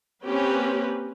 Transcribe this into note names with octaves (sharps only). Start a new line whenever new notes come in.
A#3 C4 C#4 G4 B4